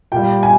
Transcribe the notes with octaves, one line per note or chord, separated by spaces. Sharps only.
A#2 G3 G5
G#5